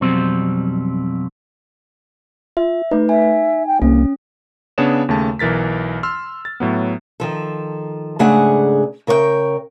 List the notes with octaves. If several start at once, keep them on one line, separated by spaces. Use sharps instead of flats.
F2 B2 F#3 G3 C4 C5
F4 E5
A3 D#4 B4
E5 G#5
G5
C2 A#3 C#4
C#3 B3 D4 G#4 C#5 E7
D#2 C#3 A3 A5
B1 E3 A#4 A6 B6
C6 E6 F6
A6
A2 F#3 B3
D#3 F3 A4
G#2 C#3 A3 D4 G#4 F#5
C#3 A#4 C#5 D5 G5